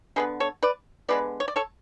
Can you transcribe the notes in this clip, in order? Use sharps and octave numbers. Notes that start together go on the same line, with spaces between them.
D3 G#3 B3 G#4 B4
A4 C#5
B4 D5
D3 G#3 B3 B4 D5
C#5
D5
A4 C#5